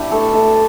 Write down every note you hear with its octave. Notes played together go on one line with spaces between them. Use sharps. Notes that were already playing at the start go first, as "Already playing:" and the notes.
Already playing: B2 D4 E4 G4
A3 A4
A3 A4